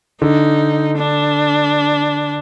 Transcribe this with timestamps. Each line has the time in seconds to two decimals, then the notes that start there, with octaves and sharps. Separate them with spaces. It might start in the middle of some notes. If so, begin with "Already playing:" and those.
0.22 D3 D#4
0.98 D4